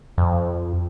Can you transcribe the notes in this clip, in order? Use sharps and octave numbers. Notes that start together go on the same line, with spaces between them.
F2